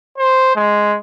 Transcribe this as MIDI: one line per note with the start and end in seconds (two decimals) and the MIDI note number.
0.18 0.55 72
0.56 0.98 56